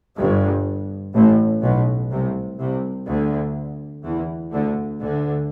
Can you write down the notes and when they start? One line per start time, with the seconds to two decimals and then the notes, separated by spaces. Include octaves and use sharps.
0.18 G1 G2
1.14 A1 A2
1.63 B1 B2
2.11 C2 C3
2.60 C2 C3
3.07 D2 D3
4.04 E2 E3
4.52 D2 D3
5.01 D2 D3